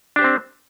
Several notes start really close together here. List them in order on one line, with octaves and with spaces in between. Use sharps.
D4 G4 C5 C4